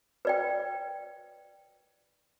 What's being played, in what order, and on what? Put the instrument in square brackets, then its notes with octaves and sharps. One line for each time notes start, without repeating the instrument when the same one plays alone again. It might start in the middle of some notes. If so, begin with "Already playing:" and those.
[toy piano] B4 D5 G5